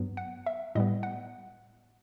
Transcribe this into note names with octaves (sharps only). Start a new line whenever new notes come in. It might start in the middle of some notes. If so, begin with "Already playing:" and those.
Already playing: G2 F#3 B3
F#5
E5
A2 G3 B3 D#5
F#5